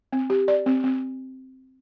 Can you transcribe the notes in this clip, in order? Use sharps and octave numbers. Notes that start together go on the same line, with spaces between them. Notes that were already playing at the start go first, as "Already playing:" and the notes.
C4
G4
D5
C4
C4